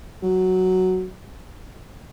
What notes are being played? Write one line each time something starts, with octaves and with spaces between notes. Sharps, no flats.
F#3